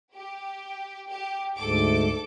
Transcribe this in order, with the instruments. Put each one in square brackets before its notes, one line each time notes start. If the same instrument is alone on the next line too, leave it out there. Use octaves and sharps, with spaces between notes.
[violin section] G4
G4
[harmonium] D2 G#2 [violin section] A4 D6